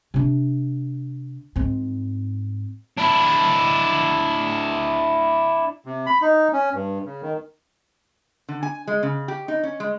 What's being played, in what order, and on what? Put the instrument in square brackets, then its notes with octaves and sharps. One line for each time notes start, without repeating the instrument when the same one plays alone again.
[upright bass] C3 D4
G#2 C4
[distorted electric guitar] D4 E4
[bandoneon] C3
B5
D#4
C#4
G2
C#3
D#3
[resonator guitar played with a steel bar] D3
G#5
G#3
C#3
G4
D#4
C#4
G#3